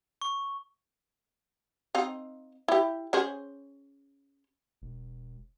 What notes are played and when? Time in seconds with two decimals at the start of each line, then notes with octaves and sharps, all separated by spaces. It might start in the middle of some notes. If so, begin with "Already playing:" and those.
0.22 C#6
1.95 C4 D#4 F5
2.68 E4 G4
3.13 C#4 G#4 C5
4.82 E1